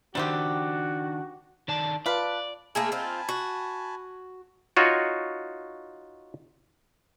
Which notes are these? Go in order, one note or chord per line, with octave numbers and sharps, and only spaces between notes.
D#3 G3 C4 D4 F#4 G4
D#3 D5 A5
F4 B4 D5 A5
A3 A#3 G#4 G#5 A5 B5
C4 D#4 F4
F#4
D#4 F4 F#4 C#5